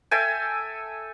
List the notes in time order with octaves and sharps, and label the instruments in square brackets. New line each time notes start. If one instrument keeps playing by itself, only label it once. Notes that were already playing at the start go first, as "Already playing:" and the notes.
[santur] A4 E5 G5 G#5